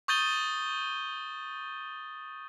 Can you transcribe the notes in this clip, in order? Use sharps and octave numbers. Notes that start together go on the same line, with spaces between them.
C#6 D#6 G6 A6 D#7 G7